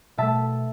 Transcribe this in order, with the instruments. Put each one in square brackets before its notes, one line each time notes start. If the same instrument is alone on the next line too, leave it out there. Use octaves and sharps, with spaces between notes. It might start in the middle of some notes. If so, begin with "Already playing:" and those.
[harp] B2 A3 E5 A5